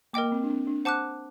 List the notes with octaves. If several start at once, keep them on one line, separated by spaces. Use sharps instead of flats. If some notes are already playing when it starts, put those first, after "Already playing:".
A#3 A#4 D#5 G5 D6
A#3
C4
D4
C4
D4
C5 F#5 A5 D6 F#6